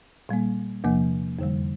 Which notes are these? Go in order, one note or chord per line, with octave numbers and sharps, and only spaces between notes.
A#2 G3 A#3
E2 C3 F3 A#3
F2 D3 G3